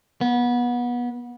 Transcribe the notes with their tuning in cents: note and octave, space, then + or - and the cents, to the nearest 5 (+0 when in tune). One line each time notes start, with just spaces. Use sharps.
B3 -25